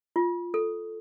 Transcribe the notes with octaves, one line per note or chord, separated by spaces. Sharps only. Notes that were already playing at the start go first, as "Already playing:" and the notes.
F4
A4